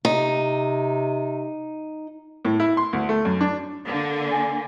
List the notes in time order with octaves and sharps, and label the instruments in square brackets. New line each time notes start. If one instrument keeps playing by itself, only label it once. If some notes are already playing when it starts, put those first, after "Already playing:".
[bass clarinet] C3 [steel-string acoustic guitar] D#4
[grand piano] A2
E4
C6
D2
A3
F#2
D4
[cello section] D3 A#3
[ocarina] G#5